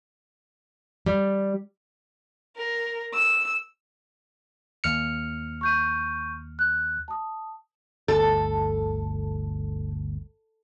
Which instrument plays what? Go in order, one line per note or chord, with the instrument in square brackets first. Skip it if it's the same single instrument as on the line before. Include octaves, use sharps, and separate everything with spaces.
[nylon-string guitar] G3
[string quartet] A#4
E6
[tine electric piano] D#2 F6 C#7
[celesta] C#6 G6 D#7
F#6
A5 D#6
[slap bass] G1 D2 [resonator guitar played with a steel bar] A4